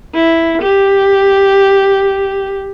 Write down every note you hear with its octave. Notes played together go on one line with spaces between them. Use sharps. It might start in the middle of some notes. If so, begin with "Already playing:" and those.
E4
G4